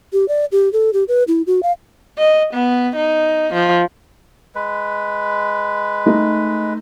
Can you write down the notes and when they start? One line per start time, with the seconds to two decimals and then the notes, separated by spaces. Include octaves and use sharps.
0.13 G4
0.28 D5
0.52 G4
0.73 A4
0.93 G4
1.08 B4
1.28 E4
1.47 F#4
1.63 F5
2.18 D#5
2.54 B3
2.96 D#4
3.54 F3
4.55 G#3 B4
6.06 A3 D#4